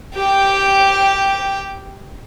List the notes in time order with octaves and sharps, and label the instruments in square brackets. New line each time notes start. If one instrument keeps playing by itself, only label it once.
[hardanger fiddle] G4 G5